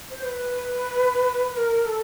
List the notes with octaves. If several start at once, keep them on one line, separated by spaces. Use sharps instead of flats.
C5
C5
B4
A#4
A4